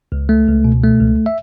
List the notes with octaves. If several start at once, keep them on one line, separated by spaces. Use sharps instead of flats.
C#2
A3
C#2
B2
A3
C#2
E5